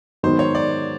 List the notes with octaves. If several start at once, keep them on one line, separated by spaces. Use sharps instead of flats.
G#2 D#3 F#3 B3 C5
C#5
D5